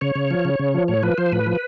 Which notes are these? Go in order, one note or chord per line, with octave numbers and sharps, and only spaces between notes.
C#3 C#5
C#3
F3
C#3
C#3
F3
A2 C#5
F3 B4
F3 C5
A2 B4
F3